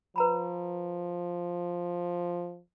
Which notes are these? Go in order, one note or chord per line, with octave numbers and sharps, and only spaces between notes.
F3 B4 A#5 B5